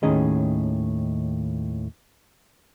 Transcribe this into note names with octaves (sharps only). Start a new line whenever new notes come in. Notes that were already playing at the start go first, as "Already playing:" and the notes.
D#2 A2 D#3 C#4 G#4 D#5